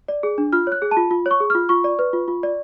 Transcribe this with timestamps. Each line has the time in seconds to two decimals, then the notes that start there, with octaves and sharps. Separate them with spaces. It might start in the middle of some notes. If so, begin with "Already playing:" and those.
0.08 D5
0.23 G#4
0.38 D4
0.53 F4 F6
0.67 C#5 F#6
0.82 G#4
0.91 A5
0.97 F4
1.11 F4
1.26 C#5 C#6
1.40 G#4
1.50 F4 F6
1.69 F4 C#6
1.84 D5
1.99 B4
2.13 F4
2.28 F4
2.43 D5